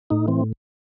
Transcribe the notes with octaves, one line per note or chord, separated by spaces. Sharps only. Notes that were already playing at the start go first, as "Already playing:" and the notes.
A2 D#4
E3 C4